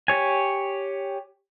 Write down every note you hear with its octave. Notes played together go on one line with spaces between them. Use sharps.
G4 C#5 G#5